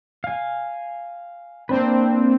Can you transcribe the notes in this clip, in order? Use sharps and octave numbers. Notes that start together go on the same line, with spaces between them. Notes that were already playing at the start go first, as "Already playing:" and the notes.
F5 G#5
A#3 C4 D4 B4